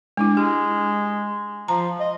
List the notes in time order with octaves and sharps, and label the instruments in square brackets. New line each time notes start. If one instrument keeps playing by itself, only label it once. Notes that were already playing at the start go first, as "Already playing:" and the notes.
[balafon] G#3 D4 E4
[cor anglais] G#3 [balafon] G4
[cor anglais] F3 [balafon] A#5
[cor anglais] D#5